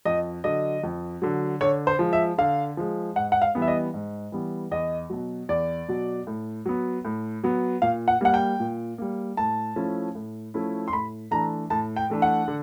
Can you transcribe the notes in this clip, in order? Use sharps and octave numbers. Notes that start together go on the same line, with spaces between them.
F2 D#5
D3 F#3 D#5
F2
D3 F#3
D3 C#5
C5
F3 G#3
E5
D3 F5
F3 G#3
G#2 F#5
F#5
F5
E3 G3 B3
E5
D#5
G#2
E3 G3 B3
E2 D#5
B2 F#3
E2 D5
B2 F#3
A2
F#3 B3
A2
F#3 B3
A#2 F5
F#5
G3 A#3 F#5
G5
A#2
G3 A#3
A2 A5
F3 A3 C#4 E4
A2
F3 A3 C#4 E4
C6
A2 B5
E3 A3 D4 A#5
A2 A5
G5
E3 A3 D4
F#5
D3